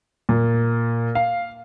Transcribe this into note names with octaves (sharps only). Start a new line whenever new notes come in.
A#2
F5